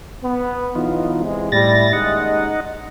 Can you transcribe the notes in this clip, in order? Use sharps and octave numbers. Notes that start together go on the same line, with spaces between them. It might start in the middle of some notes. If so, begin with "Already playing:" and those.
B3
B1 E3 B3 D#4 F4
E2 C3 G#3
A2 G3 E4 A6 A#6
D#2 C#3 G#3 D#4 D#5 F#5